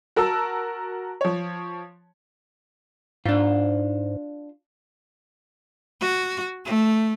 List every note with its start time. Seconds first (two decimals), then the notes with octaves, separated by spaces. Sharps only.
0.16 F#4 A#4 A5 E6
1.21 F3 C#5
3.26 G#2 D4 F4
6.01 F#4
6.65 A3